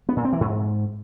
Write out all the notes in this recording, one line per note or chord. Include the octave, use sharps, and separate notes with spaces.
B3
A#2
C4
E3
G#2